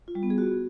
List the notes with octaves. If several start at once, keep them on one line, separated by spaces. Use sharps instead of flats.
F4
G3
B3
G#4
F#4